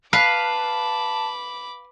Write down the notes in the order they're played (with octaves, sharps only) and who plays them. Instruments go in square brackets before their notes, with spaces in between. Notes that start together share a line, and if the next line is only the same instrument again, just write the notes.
[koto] B4 [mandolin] F5 [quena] A5 [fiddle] B5 D6